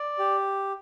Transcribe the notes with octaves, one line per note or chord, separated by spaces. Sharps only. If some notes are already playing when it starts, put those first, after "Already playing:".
Already playing: D5
G4